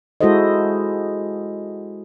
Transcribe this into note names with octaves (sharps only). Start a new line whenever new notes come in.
G#3 E4 F#4 A4 C5 D#5